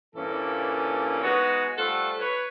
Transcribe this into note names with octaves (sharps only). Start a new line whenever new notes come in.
G2 A#2 E3 A#3 C#4 A4
G#3 B3 D#4 F#4 B4 C#5
G3 A3 F4 A4 C5 F#5
B4 C#5